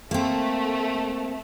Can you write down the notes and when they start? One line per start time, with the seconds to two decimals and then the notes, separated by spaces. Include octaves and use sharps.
0.11 A3 A#3 C4